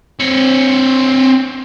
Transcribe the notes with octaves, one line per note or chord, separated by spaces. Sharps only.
C4 C#5